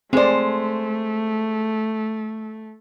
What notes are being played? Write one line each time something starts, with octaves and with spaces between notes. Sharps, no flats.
G#3 A3 C4 G#4 C5 D5